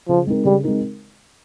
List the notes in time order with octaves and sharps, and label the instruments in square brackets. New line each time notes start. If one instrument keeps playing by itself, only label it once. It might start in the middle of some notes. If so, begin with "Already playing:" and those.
[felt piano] C#3 [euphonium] F3
[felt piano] G#3 C4 D#4 A#4
[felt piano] C#3 [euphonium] G3
[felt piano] G#3 C4 D#4 A#4